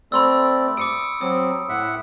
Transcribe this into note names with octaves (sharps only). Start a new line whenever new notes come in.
A3 C4 D5 B5 C6 E6
D6 D#6 C#7 D7
F#3 C4 D#6
A2 E5 F#5